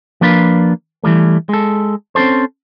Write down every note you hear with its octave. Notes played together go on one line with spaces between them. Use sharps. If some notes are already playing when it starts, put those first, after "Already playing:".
F3 A#3 D4 F4 B4
E3 F3 G3 A3
G#3 A4
C4 C#4 D#4 A4 C5